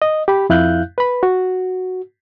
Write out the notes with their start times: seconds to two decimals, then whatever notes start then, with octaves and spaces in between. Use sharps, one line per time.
0.02 D#5
0.28 G4 B5
0.50 F2 E4 F5 F#6 G6
0.98 B4 B5
1.23 F#4